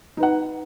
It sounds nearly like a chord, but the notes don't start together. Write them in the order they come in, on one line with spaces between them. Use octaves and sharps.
D#4 B4 F#5